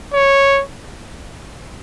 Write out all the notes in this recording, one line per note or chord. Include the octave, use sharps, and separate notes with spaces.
C#5